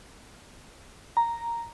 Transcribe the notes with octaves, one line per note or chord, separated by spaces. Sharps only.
A#5